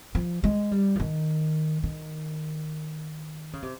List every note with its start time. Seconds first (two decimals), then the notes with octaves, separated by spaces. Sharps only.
0.15 F3
0.44 G#3
0.71 G3
0.96 F3
1.00 D#3
1.83 D#3
3.53 C#3
3.63 C3